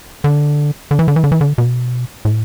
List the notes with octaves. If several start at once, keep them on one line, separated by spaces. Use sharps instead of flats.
D3
D3
E3
D3
E3
D3
E3
D3
B2
A2